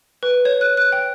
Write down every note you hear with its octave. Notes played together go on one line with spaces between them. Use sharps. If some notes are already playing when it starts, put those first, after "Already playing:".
B4
C#5
F#6
F#6
G5